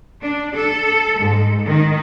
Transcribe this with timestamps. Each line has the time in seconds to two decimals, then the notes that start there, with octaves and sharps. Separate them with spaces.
0.22 D4
0.55 A4
1.20 G#2
1.65 D#3